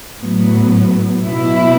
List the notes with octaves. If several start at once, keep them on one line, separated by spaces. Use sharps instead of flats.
A2 F#3 B3
B2 F#3 B3 E4